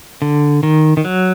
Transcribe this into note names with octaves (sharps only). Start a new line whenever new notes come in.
D3
D#3
D#3
F#3